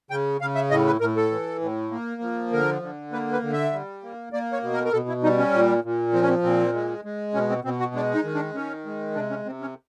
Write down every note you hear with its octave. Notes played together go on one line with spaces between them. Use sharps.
C#3 G5
C#3 F5
E5
A2 D#5
B4
A2 A#4
A4
E3
A2
A#3
F3
D3 A#4
D3
A#3 B4
B4
D3
E5
G3
A#3
A#3 D5
C#5
B2
A#4
A#4
B2 A4
E4
G3 D#4
C#4
A#2
A#2
F3 C4
C#4
C4
A#2 C4
G#3
G#3
B2 C#4
C4
B2 C4
F#4
G#3 D4
D#4
D#3
D4
D#3 C#4
G#3
C3 D4
C#4
C3 C4
C#4